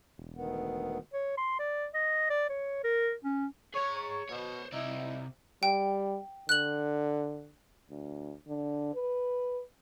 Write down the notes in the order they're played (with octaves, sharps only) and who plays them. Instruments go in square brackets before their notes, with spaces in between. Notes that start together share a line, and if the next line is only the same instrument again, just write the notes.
[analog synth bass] E1
[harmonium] D2 D#3 B3
[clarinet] C#5
C6
D5
D#5
D5
C#5
A#4
C#4
[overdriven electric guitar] G#4 A#5 [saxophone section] C#5
[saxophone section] C#5
[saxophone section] B2 [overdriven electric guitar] C5 C#5
[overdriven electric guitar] C3 D5 [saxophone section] D#4 E4
[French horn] G3 [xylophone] G5
[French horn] D3 [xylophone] F#6 F#7
[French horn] D2
D3
B4